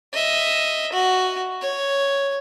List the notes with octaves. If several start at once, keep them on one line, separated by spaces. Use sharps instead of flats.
D#5 E5
F#4
C#5